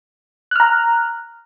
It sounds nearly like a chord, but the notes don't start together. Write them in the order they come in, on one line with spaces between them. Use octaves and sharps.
F#6 F6 A#5